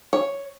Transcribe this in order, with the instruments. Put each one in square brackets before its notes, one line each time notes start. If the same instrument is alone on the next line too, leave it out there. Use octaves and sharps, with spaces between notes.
[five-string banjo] C#5